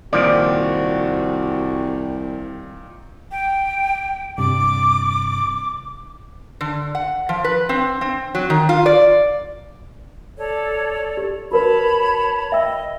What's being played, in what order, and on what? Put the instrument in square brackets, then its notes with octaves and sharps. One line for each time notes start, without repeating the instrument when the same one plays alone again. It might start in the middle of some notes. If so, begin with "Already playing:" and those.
[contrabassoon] C2 [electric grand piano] A#2 D#3 G3 [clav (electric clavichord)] F3 D5 [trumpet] F#4
[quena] G5
[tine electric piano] G2 C3 [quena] D6
[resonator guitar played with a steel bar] D3
F#5
F3
B4
C4
C4
F#3
D#3
F4
D5
[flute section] A4 C#5 D5
[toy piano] G4
[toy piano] F#4 A#4 B4 [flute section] C#5 A5 B5
[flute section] D#5 [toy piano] E5 G5 E6